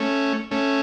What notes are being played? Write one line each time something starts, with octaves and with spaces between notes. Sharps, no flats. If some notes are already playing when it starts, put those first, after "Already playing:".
Already playing: A3 C#4
A3 C#4